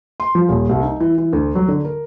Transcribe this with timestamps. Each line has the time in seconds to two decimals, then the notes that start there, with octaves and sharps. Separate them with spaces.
0.20 C6
0.35 F3
0.49 D#1
0.69 C2
0.83 D#4
1.00 E3
1.18 E3
1.33 D2
1.55 F#3
1.68 D3
1.85 A#4